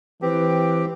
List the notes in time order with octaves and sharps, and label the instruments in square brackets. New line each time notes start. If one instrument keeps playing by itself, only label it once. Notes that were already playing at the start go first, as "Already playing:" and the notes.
[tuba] E3 [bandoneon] C4 G4 [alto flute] B4